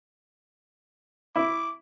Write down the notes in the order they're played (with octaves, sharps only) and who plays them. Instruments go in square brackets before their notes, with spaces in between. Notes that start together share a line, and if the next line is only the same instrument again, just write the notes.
[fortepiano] E4 [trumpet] D6